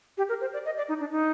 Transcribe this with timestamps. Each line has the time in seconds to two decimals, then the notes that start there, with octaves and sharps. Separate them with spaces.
0.17 G4
0.29 A#4
0.41 C5
0.53 D5
0.65 D#5
0.77 D5
0.88 D#4
1.00 D4
1.12 D#4